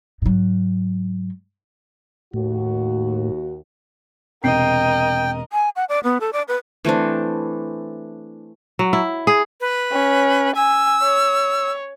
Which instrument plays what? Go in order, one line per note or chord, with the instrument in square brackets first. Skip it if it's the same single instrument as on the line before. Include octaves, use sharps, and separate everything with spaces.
[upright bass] G#2 F#3
[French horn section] D#2 F#4 [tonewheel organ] A2
[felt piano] E1 C3 C7 [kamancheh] A#4 D#5 [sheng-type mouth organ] G5
[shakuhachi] G#5
F#5
D5
B3
A4
D5
B4
[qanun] E3 A3 C4 D4
[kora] F#3
E4
G#4
[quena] B4
[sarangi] C#4
[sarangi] G#5 [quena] E6
[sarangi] C#5